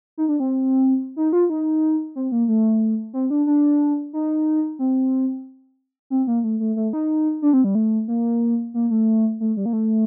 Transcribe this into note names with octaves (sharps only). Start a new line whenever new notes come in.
D#4
D4
C4
D#4
F4
D#4
C4
A#3
A3
C4
D4
D4
D#4
C4
C4
A#3
A3
A3
A3
D#4
D4
C4
G3
A3
A#3
A#3
A3
A3
G3
A#3
A3